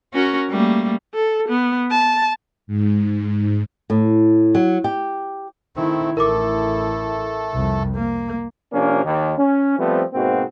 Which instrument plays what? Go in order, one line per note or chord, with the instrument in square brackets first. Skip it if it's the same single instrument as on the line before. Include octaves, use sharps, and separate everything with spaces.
[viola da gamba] C#4 F#4 A#4
G3 A3 A#3
[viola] A4
B3
A5
[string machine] G#2
[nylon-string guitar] A2
F#3
G4
[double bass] D#3 E4 [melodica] A3 C4
[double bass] A1 E4 [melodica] A3 A4 [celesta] A#4 D6
[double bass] C2 F2
A#3
[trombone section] C3 F3 A#3 C#4 D4
D#2
C#4
F3 G3 A3 B3 C4
G#2 B2 A#3 C4 F#4